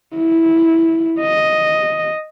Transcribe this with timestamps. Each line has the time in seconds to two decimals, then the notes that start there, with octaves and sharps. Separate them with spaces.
0.16 E4
1.21 D#5